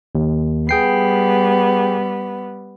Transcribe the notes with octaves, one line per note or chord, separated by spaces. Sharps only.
D#2
G3 B3 G#4 G5 C7